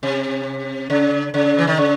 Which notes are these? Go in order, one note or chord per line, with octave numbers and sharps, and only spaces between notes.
C3
C#3
C#3
E3
D#3
C#3